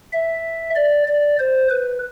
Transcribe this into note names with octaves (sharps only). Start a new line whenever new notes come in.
E5
D5
D5
C5
B4